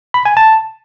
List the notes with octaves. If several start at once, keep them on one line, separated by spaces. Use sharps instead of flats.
B5
G#5
A5